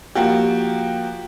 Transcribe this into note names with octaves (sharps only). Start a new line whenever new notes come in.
F3 A#3 F#4 G4